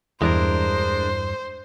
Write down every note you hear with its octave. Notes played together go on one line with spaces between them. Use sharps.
E2 G2 G#3 D4 E4 A#4 C5